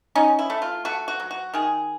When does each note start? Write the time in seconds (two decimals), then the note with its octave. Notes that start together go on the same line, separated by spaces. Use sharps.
0.15 C#4 D#4
0.39 E4
0.50 A3
0.62 F4
0.85 A3 F#4
1.08 F#4
1.20 F#3
1.31 F#4
1.54 D#3 G#4